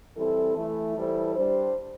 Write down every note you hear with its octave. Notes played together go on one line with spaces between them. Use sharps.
E3 G3 C4 E4 A4
E3 A3 E4
E3 G3 E4 A4 C5
G3 D4 C5